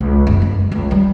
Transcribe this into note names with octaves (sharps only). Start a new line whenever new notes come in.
C#2
F#1
G#3
C#2
G3